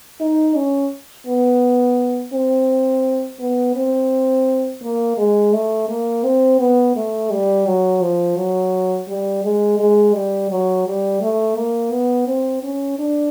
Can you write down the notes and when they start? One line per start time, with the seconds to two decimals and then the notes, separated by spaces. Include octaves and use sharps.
0.20 D#4
0.56 C#4
1.27 B3
2.33 C4
3.40 B3
3.76 C4
4.82 A#3
5.18 G#3
5.53 A3
5.89 A#3
6.24 C4
6.60 B3
6.95 A3
7.31 G3
7.66 F#3
8.01 F3
8.37 F#3
9.08 G3
9.43 G#3
9.79 G#3
10.14 G3
10.50 F#3
10.86 G3
11.21 A3
11.56 A#3
11.92 B3
12.27 C4
12.63 C#4
12.99 D4